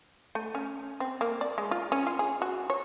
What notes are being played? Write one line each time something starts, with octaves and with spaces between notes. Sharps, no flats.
A3
C#4
C4
A#3
D5
G#3
F4
C#4
F4
G#4
F#4
C#5